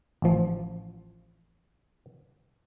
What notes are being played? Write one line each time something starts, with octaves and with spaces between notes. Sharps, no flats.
A1 F3